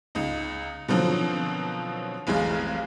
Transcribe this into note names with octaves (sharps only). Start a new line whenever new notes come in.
C#2 D#4
B2 D3 D#3 F3 F#3 C4
F1 B1 E3 G#3 G#4 F5